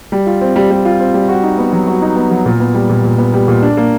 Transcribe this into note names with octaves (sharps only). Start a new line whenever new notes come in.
G3
F4
C4
G3
G3
F4
C4
G3
F#4
D#4
B3
F#3
F#4
D#4
B3
F#3
A#2
B3
G3
A#2
A#2
B3
G3
A#2
D4
A#3